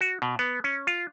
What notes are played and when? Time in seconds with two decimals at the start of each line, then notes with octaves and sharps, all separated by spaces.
0.01 F#4
0.22 B2
0.39 B3
0.64 C#4
0.87 F4